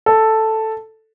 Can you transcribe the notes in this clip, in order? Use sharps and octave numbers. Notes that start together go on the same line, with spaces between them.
A4